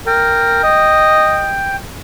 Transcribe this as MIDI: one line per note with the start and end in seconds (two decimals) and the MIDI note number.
0.07 0.62 70
0.07 1.76 79
0.63 1.51 75